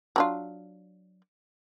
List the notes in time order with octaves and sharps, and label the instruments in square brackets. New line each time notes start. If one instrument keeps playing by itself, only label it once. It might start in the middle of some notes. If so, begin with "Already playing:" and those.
[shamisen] F#3 D4 F4